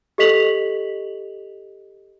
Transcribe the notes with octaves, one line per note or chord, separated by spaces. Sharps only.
G4 A4 D#5 B6 F7 F#7